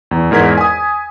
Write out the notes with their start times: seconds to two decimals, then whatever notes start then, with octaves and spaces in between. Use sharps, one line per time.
0.11 E2
0.31 E2 G#2 A#4 G#6 B6
0.58 G#5 D#6